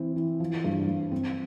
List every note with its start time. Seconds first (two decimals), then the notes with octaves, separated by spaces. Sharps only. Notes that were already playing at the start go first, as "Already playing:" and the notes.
Already playing: E3 C4
0.16 E3
0.40 F3
0.64 G2
0.88 G2
1.11 C4